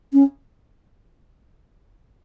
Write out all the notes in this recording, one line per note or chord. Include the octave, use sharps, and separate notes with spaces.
C#4